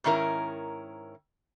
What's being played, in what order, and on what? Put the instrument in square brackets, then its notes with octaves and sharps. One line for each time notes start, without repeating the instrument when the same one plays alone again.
[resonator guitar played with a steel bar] G#2 D#3 C#4 E4 A#4